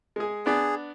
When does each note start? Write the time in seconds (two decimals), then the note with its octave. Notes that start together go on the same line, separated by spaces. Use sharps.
0.16 G#3 G#4
0.46 B3 D4 G#4